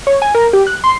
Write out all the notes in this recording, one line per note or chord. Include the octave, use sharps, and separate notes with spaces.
C#5
G#5
A#4
G4
F#6
C6